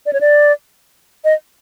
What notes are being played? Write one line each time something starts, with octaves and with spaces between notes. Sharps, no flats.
D5
C#5
D5
D#5